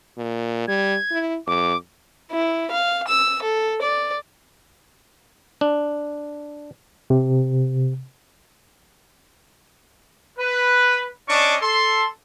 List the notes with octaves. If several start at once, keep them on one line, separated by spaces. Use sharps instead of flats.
A#2
G3 G#6
E4
F2 D6
E4
F5
E6
A4
D5
D4
C3
B4
C#4 D4 D#5 A5 C#6 D6
A4 C6